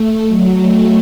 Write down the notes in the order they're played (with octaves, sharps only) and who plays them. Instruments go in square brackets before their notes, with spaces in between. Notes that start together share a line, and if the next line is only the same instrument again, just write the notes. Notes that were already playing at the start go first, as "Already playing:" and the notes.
Already playing: [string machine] A3
F#3
A3